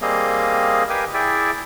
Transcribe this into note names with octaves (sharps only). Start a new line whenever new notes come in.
G3 A#3 C4 G#4 D#5 F5
G4 A#4 B4 F5 G5 G#5
E4 G#4 D5 E5 G5